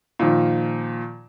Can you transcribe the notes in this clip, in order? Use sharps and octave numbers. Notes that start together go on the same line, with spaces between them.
A#2 D#3 F3